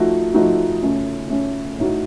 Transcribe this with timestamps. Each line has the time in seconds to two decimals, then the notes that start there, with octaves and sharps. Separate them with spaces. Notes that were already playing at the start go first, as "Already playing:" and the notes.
Already playing: F3 A3 D#4 F#4
0.33 F3 A3 D#4 F#4
0.82 C#3 A3 C#4
1.30 C#3 A3 C#4
1.79 A2 A3 D#4 F#4